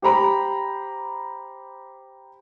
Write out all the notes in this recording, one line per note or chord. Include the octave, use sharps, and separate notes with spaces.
G4 C5 A#5 B5